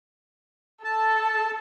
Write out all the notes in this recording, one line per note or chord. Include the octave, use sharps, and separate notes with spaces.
A4 A5